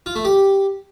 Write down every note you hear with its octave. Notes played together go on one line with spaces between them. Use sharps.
F4
A3
G4